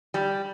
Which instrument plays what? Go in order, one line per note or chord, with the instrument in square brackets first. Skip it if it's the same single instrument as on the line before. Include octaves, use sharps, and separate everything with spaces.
[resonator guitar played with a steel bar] G3